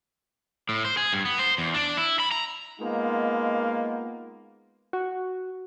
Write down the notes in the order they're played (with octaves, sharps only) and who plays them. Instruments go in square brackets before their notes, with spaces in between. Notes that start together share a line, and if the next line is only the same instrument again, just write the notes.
[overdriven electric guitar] A2
C5
G#4
G2
B3
C5
E2
D4
E4
B5
A#5
[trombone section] G#3 A#3 B3 D#4 F4
[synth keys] F#4